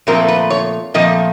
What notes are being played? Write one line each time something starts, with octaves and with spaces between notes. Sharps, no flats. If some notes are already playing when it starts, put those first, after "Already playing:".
A#2 F3 A3 C4 A#4
B4
C#5
A#2 F3 A3 C4 D#5